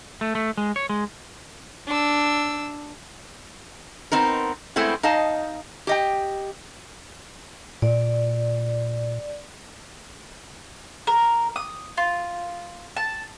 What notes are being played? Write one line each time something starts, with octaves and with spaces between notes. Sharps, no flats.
A3
A3
G#3
C#5
G#3
D4 E6
B3 C4 D#4 A#4
G#3 A3 B3 C4 E4
D#4 D#5 F5 A5
G4 D#5 G5
A#2 D5
A#4
D#6
F4
A5